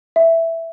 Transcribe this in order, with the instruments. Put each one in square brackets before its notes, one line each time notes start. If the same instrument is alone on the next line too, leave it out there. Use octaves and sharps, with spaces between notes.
[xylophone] E5